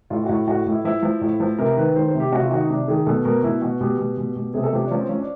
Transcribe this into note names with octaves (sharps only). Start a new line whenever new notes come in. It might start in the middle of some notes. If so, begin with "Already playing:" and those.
A2 F4
F#4
A2
A2 F#4
A2
E4
F3 E4
F3
A2
F3
C3 A#4
D#3 B4
D#3 C5
C5
C3
G4
C3 F#4
F4
D#3 F#4
D#4
C3 D4
D#3 G#4
B2 A4
B2 A#4
B2 E4
B2 F#4
B2 G4
B2
B2
B2
C3 G#4
A4
F3 G4
D4
F3 C#4
C4
F3 C#4
D4